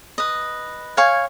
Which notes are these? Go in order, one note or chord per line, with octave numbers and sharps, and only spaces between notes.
B4 D#5
C#5 F5 G#5 C#6